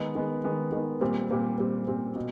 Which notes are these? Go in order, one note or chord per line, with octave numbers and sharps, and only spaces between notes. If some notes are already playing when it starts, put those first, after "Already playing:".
Already playing: D#3 G#3 B3
D#3 G#3 B3
D#3 G#3 B3
D#3 G#3 B3
A#2 G3 C4
A#2 G3 C4
A#2 G3 C4
A#2 G3 C4
B2